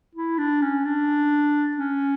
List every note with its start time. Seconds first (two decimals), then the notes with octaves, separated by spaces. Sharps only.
0.15 E4
0.38 D4
0.62 C#4
0.85 D4
1.77 C#4